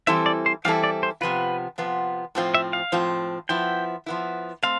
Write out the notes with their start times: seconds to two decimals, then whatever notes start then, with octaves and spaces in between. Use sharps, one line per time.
0.07 E3 G3 C4 E4 A4 E5
0.26 D5
0.46 C5
0.65 E3 G3 C4 E4 A4 F5
0.84 D5
1.03 C5
1.21 C3 F3 B3 F4 B4
1.78 C3 F3 B3 F4
2.35 A2 F3 C4 F4
2.54 E5
2.73 F5
2.92 A2 F3 C4 F4
3.49 F3 B3 E4 G5
4.06 F3 B3 E4
4.63 A3 C4 F5